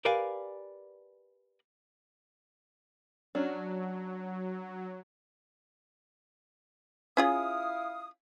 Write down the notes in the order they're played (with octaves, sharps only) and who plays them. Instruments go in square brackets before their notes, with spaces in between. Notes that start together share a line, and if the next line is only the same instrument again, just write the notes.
[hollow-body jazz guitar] G4 A#4 B4 D5 F5 G#5
[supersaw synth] F#3 [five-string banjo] C#4 D4
[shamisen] C#4 F4 G#4 [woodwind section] E4 F5 D#6